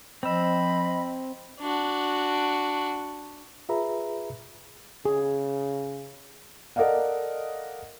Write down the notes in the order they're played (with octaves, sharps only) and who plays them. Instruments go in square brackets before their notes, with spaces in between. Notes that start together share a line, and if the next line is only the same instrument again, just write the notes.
[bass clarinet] F3 [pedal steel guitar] C4 E6 [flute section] D#5 B5
[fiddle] D4 F#4
[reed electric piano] F4 G#4 B4 E5 A#5 B5
[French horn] C#3 [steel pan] G#4
[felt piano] A4 A#4 D5 D#5 F5 F#5